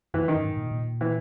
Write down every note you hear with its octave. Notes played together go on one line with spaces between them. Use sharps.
F#2 E3
D#3
G#2
A#2
B2
A#2
E3